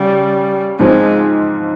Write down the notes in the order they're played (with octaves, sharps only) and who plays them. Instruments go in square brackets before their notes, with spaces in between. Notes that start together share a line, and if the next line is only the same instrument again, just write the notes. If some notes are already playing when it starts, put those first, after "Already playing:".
Already playing: [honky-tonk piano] C#3 [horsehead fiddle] G3
[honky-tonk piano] G#2 F3 C4 [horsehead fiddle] G#3